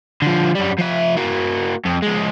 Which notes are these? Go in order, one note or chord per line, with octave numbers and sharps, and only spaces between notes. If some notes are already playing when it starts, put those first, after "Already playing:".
D3 F3
F#2 G3
F3 E5
A#3 F#4
F2
F3 G#3